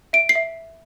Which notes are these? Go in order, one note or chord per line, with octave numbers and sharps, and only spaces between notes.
E5 D7
C7
E5